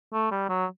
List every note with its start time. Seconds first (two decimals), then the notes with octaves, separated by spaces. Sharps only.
0.13 A3
0.31 G3
0.49 F#3